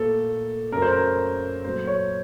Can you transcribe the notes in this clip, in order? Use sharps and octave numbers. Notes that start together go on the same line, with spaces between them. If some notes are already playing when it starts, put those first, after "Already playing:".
Already playing: A#2 A3 A4
F#2 C#3 A3 A#4
C5
A#4
A#2 F#3 A3 C5
C#5